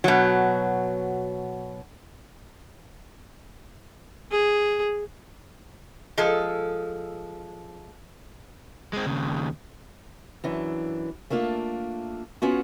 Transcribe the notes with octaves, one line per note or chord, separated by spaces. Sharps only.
B2 F#3
G#4
F3 G#3 A4
G#3 C4
D#2 C#3
F#2 E3 D4
A3 A#3 D4 F4
B3 C#4 F4 F#4